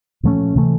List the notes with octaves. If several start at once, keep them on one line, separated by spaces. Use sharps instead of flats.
A#2 F3 A3 C#4
C3 E3 A3